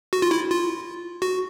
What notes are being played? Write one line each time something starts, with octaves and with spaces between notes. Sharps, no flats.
F#4
F4
E4
F4
F#4